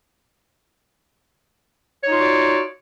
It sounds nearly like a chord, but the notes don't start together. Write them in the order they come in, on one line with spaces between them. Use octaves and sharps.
C#5 D#4 F4 F#4 D5